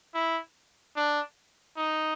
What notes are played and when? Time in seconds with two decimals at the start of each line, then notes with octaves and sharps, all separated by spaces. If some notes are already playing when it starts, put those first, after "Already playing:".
0.14 E4
0.96 D4
1.77 D#4